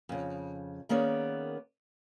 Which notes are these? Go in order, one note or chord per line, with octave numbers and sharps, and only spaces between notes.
F2 C#3
D#3 A#3 B3 C#4 G#4 D5